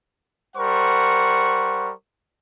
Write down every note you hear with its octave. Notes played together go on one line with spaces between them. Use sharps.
G3 A#4 C5 F#5 C#6